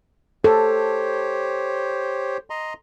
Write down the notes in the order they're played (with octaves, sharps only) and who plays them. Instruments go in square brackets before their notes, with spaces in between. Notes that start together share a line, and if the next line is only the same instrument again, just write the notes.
[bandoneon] G4 C5 C#5 [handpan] A4
[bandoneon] D#5 A#5 C6